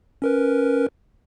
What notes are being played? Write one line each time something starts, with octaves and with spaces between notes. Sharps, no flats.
C#4 A#4 B4